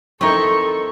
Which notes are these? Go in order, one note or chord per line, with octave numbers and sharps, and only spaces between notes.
F2 C4 D#4 E4 A4 A#4 C#6